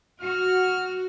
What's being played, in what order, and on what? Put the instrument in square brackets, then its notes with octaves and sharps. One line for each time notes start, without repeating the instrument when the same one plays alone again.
[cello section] F#4 [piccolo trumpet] F6